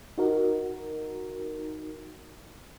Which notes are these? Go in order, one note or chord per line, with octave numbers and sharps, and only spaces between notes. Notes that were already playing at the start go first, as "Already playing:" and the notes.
D#4 F#4 A#4